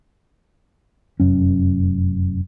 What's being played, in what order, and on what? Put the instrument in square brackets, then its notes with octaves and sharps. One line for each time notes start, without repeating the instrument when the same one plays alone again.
[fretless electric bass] F1 F#2 C#4